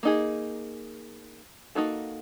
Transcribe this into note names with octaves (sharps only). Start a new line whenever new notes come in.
A#3 D#4 G#4
A#3 D#4 F#4 A4